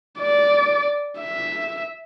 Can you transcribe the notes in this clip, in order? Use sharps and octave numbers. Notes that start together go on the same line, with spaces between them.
D5
E5